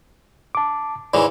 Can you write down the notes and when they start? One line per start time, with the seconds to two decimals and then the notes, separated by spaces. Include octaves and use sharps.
0.55 A5 D6
1.14 G#2 C#3 E3 D5